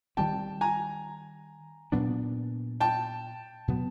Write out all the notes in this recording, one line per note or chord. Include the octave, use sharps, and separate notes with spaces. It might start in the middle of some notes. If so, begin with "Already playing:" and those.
D#3 G3 C4 G5 A5
G#5 A#5
A#2 F#3 B3 D4
G5 A5
B2 F#3 B3